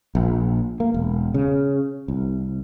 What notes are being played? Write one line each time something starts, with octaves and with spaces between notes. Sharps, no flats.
A#1
A#3
E1
C#3
C2